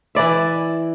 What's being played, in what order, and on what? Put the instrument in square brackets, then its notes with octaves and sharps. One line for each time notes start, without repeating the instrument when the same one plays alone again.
[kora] E3 E4 D5 E5